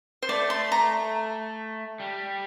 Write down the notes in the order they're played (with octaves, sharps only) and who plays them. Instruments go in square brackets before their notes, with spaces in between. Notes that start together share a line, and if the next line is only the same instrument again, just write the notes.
[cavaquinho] C5
[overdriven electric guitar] A3 [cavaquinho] D5
[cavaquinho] C6
A#5
[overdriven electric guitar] G3